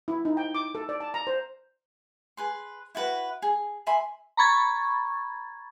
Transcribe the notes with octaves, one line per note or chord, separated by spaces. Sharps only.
E4
D#4
G5
D6
A4
D5
A5
A#5
C5
G#4 B4 C6
E4 F#4 B4 F#5
G#4
E5 G#5 B5 C6
A#5 B5 C#6 G#6 A6